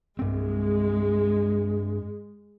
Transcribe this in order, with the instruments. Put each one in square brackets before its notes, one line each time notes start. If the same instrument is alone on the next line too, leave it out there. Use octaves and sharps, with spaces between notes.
[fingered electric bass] G2 C4 [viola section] G#3